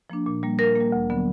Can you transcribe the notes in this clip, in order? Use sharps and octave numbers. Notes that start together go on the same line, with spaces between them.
F3 A#3 D4
A#2
G3 A#3
A#2 A#4
A#3
G3
D2
D3 F#3 B3